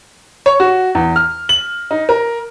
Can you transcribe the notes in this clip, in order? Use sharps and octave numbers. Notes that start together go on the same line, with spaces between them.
C#5
F#4
E2
F6
F#7
D#4
A#4